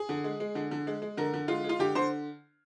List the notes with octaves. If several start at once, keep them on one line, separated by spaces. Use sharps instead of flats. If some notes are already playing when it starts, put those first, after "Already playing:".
Already playing: G#4
D3
G#3
G#3
D3
D3
G#3
G#3
D3 A#4
D3
G#3 F4
G#3
F4
D3 G4
D3 C5